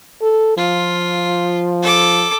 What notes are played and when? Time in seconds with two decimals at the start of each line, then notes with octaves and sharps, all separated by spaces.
0.22 A4
0.57 F3 F4
1.83 A4 D6